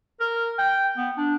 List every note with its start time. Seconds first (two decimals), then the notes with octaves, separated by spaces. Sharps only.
0.20 A#4
0.58 G5
0.97 B3
1.17 D4